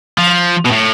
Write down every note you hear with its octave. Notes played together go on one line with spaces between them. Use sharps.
F3
B2
A2